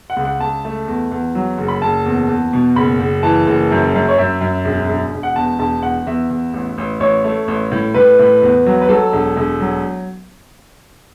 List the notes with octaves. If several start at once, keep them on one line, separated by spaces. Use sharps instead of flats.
F#5
C#2
F#5
C#2 A5
A3
E2
E2
F#3
F#1
B5
F#1 A5
E2
E2
B2
F#1 B5
F#1
E3 A5
F#1
F#2
F#2
C#5
F#2 E5
F#2
E1
E1
E1
F#5
E2 A5
E1 A5
E2 F#5
E2 E5
E2
A1
A1
A1 C#5
A3
A1
A2
A2 B4
A2
E2
F#3
B4
F#3 A4
E1
E1
F#3